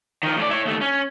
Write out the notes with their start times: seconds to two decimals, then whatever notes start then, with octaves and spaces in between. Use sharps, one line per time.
0.23 D#3 F3
0.38 A2 D5
0.51 E4 C#5
0.65 D#2 A3
0.81 C#4